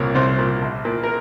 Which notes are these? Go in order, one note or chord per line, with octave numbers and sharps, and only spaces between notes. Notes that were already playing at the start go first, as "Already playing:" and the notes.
Already playing: C2 A#2 C#5
C2 C5
A#2
A#1
A#2
A#4